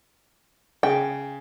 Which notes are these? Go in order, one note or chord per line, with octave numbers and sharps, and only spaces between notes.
C#3 G5